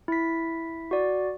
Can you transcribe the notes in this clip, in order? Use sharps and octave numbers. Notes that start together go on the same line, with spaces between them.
E4 B6
F#4 D5